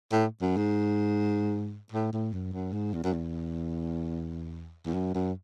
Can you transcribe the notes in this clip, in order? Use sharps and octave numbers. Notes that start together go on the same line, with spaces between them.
A2
F#2
G#2
A2
A2
F#2
F#2
G#2
E2
F#2
E2
E2
F#2
F#2